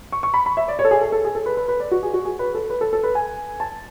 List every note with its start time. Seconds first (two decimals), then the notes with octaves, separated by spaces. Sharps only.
0.12 C#6
0.23 C#6
0.34 B5
0.46 B5
0.57 E5
0.68 D5
0.79 C#5
0.85 A4
0.91 G#4
1.01 A4
1.12 A4
1.25 G#4
1.35 A4
1.46 B4
1.57 B4
1.68 B4
1.80 D5
1.91 F#4
2.03 G#4
2.14 F#4
2.25 G#4
2.39 B4
2.55 A4
2.70 B4
2.81 A4
2.93 A4
3.03 B4
3.15 G#5
3.60 A5